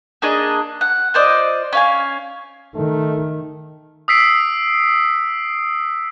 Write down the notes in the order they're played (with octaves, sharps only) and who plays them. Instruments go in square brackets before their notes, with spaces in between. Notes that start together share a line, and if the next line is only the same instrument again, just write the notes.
[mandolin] A#3 D4 G#4 D#5
F#5
F4 C5 D5 D#5
C#4 F5 G#5
[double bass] D#3 [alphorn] A3
[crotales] D#6 E6 B6 C7 D7